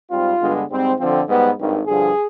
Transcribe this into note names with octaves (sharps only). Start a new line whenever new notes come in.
G#2 G3 C4 F4
G2 D3 G#3 B3
G#2 G3 C4
F2 D3 F3 C4
G#2 G3 B3
G#1 G2 D#3
G2 D3 F3 G#4